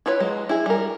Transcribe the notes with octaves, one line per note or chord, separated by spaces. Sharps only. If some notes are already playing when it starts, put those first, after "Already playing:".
E4 F4 B4 C#5
F#3 G#3
E4 G#4
G3 A#4